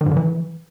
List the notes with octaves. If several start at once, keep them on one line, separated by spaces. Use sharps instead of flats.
D#3
G#2
D3
E3